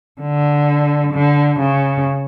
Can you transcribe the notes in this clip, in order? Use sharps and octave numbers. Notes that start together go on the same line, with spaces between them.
D3
D3
C#3